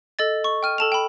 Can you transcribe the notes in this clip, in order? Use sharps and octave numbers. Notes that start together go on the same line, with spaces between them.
A4 D#5 A6
C#6
G5 F6 D#7
A4 A5 F7
G5 B5